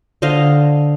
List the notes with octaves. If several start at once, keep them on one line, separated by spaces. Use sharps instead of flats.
D3 C5 D#5 F5